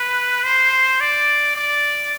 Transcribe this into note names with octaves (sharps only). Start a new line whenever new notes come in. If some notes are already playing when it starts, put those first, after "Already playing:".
Already playing: B4
C5
D5
D5